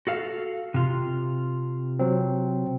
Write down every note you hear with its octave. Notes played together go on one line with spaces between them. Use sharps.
F#4 A4 F5
C3 F4
F#3 C4